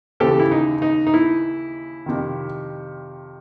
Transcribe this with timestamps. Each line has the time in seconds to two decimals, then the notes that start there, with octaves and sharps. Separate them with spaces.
0.20 D#2 C#3 E3 G4 A4
0.39 E4
0.51 D#4
0.82 D#4
1.07 D#4
1.14 E4
2.06 F2 C3 D#3